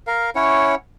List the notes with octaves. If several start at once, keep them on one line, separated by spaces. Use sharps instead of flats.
A#4 F5
C#4 E4 C#5 F#5